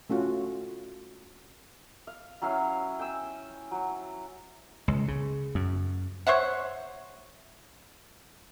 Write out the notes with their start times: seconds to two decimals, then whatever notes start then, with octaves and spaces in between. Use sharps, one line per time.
0.10 A3 C#4 F4 F#4
2.07 F5
2.42 F#3 C#4 E4 F5
2.99 G5 G#5 E6
3.71 F#3
4.88 C#2
5.08 C#3
5.55 F#2
6.27 C5 C#5 E5 F#5